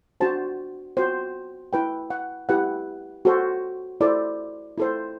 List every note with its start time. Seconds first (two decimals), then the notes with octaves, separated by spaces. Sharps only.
0.20 D4 F#4 C5 A5
0.97 F#4 C5
1.73 E4 B4 G5
2.10 F#5
2.49 E4 G4 B4 F#5
3.25 F#4 A4 C5
4.01 E4 A4 C5 D5
4.78 E4 A4 C5